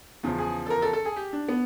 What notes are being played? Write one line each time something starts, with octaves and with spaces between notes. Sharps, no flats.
E2 C#3 F3
G#4
A4
A#4
A4
A4
G#4
G4
D4
B3